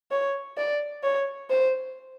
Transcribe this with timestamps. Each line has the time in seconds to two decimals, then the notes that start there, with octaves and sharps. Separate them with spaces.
0.11 C#5
0.57 D5
1.03 C#5
1.50 C5